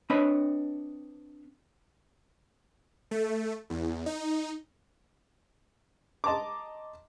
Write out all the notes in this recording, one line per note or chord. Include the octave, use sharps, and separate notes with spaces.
C4 D4 B4 C#5 D#5 B5
A3
E2
D#4
D#5 A5 A#5 C6 D6